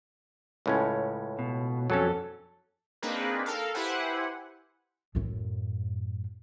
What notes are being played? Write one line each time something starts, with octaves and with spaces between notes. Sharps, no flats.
C#2 A2 C#4
B2
F2 F#3 C#4 A4
A#3 C4 D4 D#4 G#4 B4
A4 A#4 F5
E4 G4 B4 C5 F#5 G#5
F#2 A2